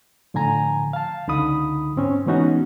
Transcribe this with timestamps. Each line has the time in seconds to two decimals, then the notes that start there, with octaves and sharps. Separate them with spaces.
0.34 A2 D3 F3 G#5 A#5
0.93 F5 A5
1.27 C#2 D3 D#4 B5 D#6
1.96 G#2 C4 C#4
2.26 E3 G#3 B3 C#4 D#4 F#4